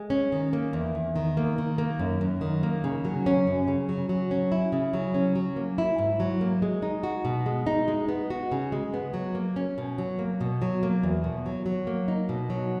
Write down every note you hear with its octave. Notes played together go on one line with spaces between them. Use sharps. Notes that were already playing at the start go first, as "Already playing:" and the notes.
Already playing: G#3
C#4
D#3
A#3
E2
E2
D#3
A#3
D#3
A#3
F#2
F#2
D#3
A#3
C#3
F#3
C#4
F#2
C#3
F#3
F#3
C#4
E4
C#3
F#3
C#4
F#3
A#3
E4
G#2
F#3
A#3
G#3
D#4
F#4
B2
G#3
D#4
G#3
B3
F#4
C#3
G#3
B3
F#3
A#3
C#4
B2
F#3
A#3
B2
F#3
A#3
E2
B2
F#3
F#3
A#3
D#4
B2
F#3